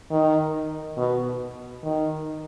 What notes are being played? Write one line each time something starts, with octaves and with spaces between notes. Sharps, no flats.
D#3
B2
D#3